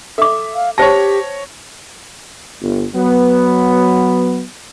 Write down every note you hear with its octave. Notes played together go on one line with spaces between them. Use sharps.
A4 E5 D6
F5
G4 C5 C#5 G5 A5 A#6
G1
F#3 B3